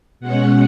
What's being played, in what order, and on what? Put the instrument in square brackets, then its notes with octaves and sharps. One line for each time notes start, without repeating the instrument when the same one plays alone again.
[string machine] B2 G#3 C#4 F#5